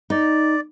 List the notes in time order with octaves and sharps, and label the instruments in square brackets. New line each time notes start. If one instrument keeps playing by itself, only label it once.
[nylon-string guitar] D#4 [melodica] D5